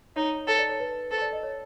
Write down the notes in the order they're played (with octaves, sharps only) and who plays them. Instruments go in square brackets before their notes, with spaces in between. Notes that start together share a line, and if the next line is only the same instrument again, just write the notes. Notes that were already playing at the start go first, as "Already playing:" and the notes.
[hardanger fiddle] D#4 [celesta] C#5
[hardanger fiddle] A4 [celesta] C#5
[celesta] D5
C#5
B4
[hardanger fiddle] A4 [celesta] C5
[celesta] D5
D#5
C#5